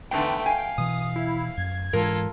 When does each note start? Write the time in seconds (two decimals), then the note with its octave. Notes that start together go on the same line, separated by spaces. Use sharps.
0.11 E2 G#2 D3 A3 B3 G5
0.46 F5 G#5
0.78 B2 E3 D#6
1.16 E4
1.57 F#2 G#6
1.93 G#2 E3 G#3 F4 A4 A#4